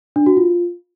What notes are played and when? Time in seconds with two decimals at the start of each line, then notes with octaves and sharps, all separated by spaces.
0.16 D4
0.26 F#4
0.37 F4